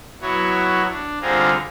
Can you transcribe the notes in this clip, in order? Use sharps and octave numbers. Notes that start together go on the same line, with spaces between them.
F#3 B3 E4 F#4 C#5
D4
D3 G3 C4 F4 G#4 A#4